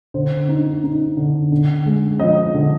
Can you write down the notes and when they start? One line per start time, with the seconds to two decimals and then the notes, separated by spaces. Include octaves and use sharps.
0.14 D3 C5
0.49 D#4
0.84 D#4
1.17 D3
1.52 D3
1.86 G#3
2.20 F3 D#5
2.54 D3